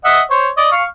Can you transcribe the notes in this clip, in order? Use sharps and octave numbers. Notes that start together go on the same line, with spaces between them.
D#5 E5 F#5
C5 C#5
D5 D#5
F5 C#6